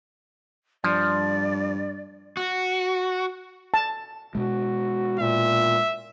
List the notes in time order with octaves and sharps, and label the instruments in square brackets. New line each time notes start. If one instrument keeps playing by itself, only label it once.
[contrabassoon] G2 [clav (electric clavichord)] F3 [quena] D5
[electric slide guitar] F#4
[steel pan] A5
[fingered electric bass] B2 G#3 [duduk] F#4
[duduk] A#2 [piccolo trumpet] E5